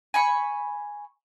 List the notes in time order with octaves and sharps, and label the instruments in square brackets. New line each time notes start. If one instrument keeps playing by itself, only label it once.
[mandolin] G#5 B5 C#6